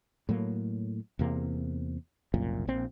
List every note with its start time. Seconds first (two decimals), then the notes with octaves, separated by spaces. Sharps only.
0.29 A2 F#3 A#3
1.19 E2 C3 A#3
2.34 F#1 C2 F#2 A#2
2.67 A#1 A#2 C4